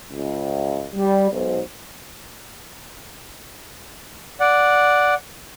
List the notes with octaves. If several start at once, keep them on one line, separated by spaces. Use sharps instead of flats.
C#2
G3
B1 G#2 C5
D5 F#5